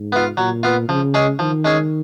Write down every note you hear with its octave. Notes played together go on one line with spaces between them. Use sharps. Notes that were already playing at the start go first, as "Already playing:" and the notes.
Already playing: G#2
B3 F4
A#2 F#3
B3 F4
C#3 F3
G#3 C#4 G#4
D#3 F3
G#3 C#4 G#4